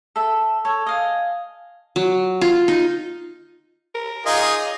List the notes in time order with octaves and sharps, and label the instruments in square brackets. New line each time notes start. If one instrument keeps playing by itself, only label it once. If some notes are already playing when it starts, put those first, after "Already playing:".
[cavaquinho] A4 E5
A4 C#5
D#5 F5 G#5
[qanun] F#3
F4
D#4
[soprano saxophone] A#4
[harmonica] D#4 F4 G#4 [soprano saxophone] D#5